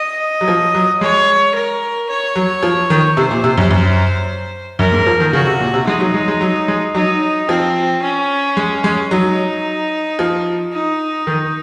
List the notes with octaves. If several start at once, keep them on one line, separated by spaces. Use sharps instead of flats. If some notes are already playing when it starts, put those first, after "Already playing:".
Already playing: D#5
F#3
F3
F#3
G#3 C#5
A#4
C#5
F#3
F3
D#3
C3 C5
A#2
C3
F#2
F#2
F#2 A#4
G#2
F3
D#3
C#3 F#4
C3
A#2
C3
G#3 D#4
F#3
G#3
G#3
F#3
G#3
F#3 D#4
F3 C4
C#4
G#3
G#3
F#3 D#4
F3
D#4
D#3